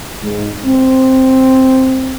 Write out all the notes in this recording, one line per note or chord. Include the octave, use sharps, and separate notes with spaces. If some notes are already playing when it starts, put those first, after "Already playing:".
G#2
C4